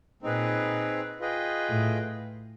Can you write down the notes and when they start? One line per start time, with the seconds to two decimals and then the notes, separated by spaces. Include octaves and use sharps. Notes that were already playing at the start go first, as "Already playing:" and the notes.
0.22 A#2 C4 D#4 G#4 B4
1.20 F4 G#4 B4 D#5 G5
1.69 A2